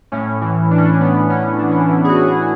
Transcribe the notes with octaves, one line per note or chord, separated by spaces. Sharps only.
A2 C#4
E3
E3 D4
C#4
D4
B3
A2 C#4
E3 D4
C#4
D4
E3 E4
G#4
F#4
A2
G#4